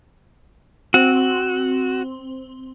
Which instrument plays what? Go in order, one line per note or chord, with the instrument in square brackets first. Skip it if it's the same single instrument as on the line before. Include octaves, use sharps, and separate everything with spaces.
[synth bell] C4 [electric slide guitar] F#4